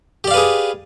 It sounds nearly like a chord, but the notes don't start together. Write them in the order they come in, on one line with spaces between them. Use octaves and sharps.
G4 D5 F5 B4 G#4